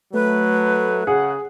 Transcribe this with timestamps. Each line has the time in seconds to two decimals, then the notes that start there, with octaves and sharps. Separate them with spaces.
0.14 F#3 A3 B4
1.07 C#3 G#4 F#5